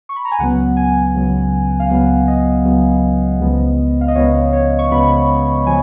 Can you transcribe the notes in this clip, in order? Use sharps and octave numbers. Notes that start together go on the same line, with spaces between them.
C#6
B5
A#5
G#5
C#2 C#3 F#3 B3 F#5
G#5
C#2 C#3 F#3 B3
F5
C#2 C#3 F#3 B3 F#5
D#5
C#2 C#3 F#3 B3
C#2 C#3 F3 B3
F5
D#5
C#2 C#3 F3 B3 C#5
C#5
C#6
C#2 C#3 F3 B3 B5
F3 G#5